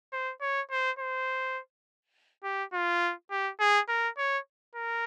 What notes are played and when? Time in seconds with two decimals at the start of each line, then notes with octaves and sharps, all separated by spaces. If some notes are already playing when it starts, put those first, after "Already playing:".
0.13 C5
0.41 C#5
0.71 C5
0.99 C5
2.44 G4
2.73 F4
3.31 G4
3.60 G#4
3.89 A#4
4.18 C#5
4.75 A#4